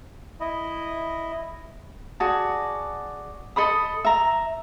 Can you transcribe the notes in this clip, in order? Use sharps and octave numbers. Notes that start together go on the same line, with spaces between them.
E4 D#5
F#4 G#4 D5 A5
A4 D#5 B5 D#6
E5 A#5